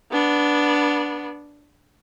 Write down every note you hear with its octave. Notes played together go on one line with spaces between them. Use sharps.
B3 D4